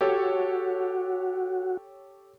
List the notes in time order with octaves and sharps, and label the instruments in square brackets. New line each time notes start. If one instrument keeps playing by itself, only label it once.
[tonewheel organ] F#4 [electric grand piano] G4 A4 C#5